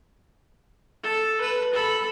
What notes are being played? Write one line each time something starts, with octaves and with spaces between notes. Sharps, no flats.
A4
B4
A4 B5